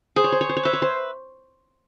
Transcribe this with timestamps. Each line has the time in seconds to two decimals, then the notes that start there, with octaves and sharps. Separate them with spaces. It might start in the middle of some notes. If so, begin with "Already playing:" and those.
0.16 G#4 C5
0.24 C#5
0.32 C5
0.41 C#5
0.49 C5
0.57 C#5
0.63 B4 C5 E5
0.73 C#5
0.82 C5